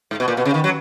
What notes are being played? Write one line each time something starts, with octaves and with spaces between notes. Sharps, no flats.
G#2
B2
A#2
B2
C#3
D#3
F#3